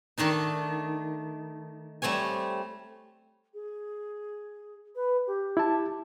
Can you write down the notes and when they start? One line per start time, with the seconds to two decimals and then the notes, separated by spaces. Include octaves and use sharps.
0.18 D#3 A3 D4 D#4
2.02 G3 A3 C4 C#5 G#5
3.54 G#4
4.95 B4
5.27 G4
5.57 E4 A5